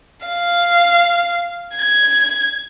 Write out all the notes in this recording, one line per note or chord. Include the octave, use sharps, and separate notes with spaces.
F5
G#6